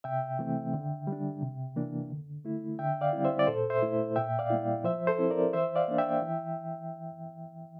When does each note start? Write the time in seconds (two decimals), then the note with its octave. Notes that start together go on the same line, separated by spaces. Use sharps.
0.04 C3 E5 G5
0.39 E3 A3 C4
0.73 D3
1.07 G3
1.12 D4
1.42 C3
1.76 E3 A#3 D4
2.10 D3
2.45 A3 E4
2.79 D3 E5 G5
3.01 D5 F5
3.13 G3 C4 E4
3.25 C5 E5
3.39 D5
3.47 A#2 A4 C5
3.70 C5 E5
3.82 A3 E4
4.16 A#2 E5 G5
4.39 D5 F5
4.50 G3 A#3 E4
4.84 F3 C5 E5
5.07 A4 C5
5.19 C4 E4
5.30 A#4 D5
5.53 E3 C5 E5
5.76 D5 F5
5.88 A#3 D4
5.98 E5 G5
6.22 E3